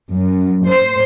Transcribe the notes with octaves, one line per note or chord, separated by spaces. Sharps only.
F#2
C5